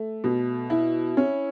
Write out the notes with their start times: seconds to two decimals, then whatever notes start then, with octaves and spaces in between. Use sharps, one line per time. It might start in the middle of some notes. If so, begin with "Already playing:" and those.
Already playing: A3
0.24 B2
0.70 E4
1.17 C#4